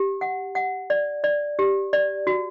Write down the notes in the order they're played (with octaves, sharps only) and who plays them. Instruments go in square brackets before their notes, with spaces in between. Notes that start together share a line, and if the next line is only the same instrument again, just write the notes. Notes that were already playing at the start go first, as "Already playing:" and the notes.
Already playing: [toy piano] G4
F#5
F#5
D5
D5
G4
D5
F#4